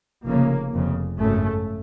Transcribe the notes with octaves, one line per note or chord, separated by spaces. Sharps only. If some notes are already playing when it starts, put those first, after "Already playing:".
F1 F2 C#3 A#3
F1 F2 C#3
G#1 F#2 C#3 A3